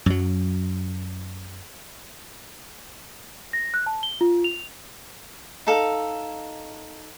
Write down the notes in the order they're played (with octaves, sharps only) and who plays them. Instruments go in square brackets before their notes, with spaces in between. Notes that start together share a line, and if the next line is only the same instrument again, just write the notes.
[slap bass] F#2 F#3
[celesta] A#6
F#6
A5
G7
F4
F7
[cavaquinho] D#4 A4 F5